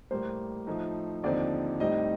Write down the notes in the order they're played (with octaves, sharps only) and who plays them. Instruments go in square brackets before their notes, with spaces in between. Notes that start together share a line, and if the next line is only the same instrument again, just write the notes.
[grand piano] A2 G3 A#3 C5
A2 F3 A3 D#4
D#2 D3 F3 C4 D#4 D5
A2 G3 C4 D#4 D#5